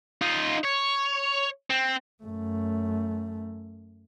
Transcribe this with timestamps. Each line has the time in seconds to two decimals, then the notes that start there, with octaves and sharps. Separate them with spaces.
0.22 D#4 F4
0.65 C#5
1.70 C4
2.24 F#2 A3